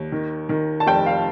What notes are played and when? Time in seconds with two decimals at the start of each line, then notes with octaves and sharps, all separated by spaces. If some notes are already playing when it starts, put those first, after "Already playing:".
Already playing: D#2
0.12 D#3
0.49 D#3
0.80 A5
0.87 F1 G5
1.06 F5